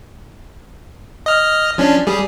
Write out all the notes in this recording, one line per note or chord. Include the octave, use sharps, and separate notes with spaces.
D#5 F6
F3 C#4 D4
G3 G#4